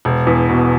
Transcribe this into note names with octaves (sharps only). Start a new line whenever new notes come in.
E1
E2
B2